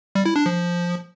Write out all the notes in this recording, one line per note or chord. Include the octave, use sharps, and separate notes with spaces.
G3
E4
D4
F3